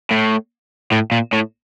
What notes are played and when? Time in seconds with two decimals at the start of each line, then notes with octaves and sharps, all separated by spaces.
0.11 A2
0.92 A2
1.12 A#2
1.33 A2